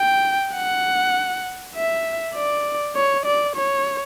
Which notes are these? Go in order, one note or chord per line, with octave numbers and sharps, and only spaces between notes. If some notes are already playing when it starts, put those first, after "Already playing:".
Already playing: G5
F#5
E5
D5
C#5
D5
C#5